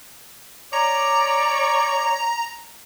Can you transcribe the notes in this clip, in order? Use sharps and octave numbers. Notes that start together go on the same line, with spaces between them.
C#5 D5 A#5